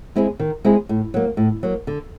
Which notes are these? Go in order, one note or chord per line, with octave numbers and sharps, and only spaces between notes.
G#3 C4 E4 G#4
D#3
G#3 C4 E4 G#4
A2
F#3 A#3
A2
F#3 A#3
D3